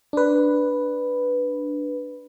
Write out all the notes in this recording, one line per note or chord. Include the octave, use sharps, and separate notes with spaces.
D4 B4